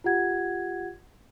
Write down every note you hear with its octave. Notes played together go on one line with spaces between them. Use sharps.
F4 G4 F#5 G#6